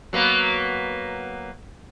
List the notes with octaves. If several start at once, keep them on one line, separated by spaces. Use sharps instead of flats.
F#3 A#3 B3